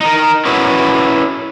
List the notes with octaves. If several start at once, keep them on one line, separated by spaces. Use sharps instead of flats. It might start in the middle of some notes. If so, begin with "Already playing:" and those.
D#4 A#4
C#4 E4 F#4 B4